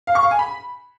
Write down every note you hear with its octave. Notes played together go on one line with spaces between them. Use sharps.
F5
C#6
F5
G#5
B5